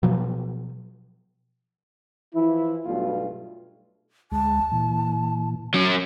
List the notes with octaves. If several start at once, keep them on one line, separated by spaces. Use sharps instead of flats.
B2 F3 F#3
E3 F3 E4
B1 G2 B2 A3 F4
D2 G#3 A5
A#2 E3
F#3 C#4